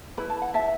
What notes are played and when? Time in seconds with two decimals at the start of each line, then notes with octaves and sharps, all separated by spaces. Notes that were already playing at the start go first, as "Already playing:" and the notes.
0.17 E4 B4 B5
0.30 A5
0.42 F#5
0.54 E5 A5